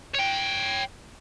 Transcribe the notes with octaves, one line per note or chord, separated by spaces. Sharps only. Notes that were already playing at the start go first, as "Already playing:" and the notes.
C#5 G5